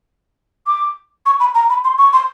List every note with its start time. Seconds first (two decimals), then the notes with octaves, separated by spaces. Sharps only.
0.67 D6
1.26 C#6
1.40 B5
1.54 A#5
1.70 B5
1.84 C6
1.98 C#6
2.13 C6